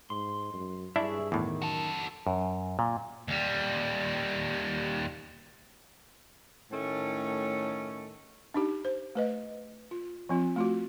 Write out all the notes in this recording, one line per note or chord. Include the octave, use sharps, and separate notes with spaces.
G#2 C6
F#2
G2 D4 E4 G#4 C#5 E5
E2 A2 D#3
F#2 F#4 A4
F#2
A#2
D#2 G3
A2 D#3 A3 C#4
D4 D#4 G4
C5
A3 B4 D#5
F4
F3 C4 F4
A3 F4 F#4